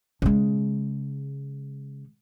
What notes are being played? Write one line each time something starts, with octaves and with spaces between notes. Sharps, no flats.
C#3 G#3